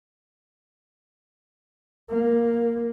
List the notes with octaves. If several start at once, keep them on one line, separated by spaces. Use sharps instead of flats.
A#3